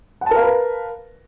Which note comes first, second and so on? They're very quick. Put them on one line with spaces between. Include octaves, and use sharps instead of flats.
F#5 A5 A#4 F5 B4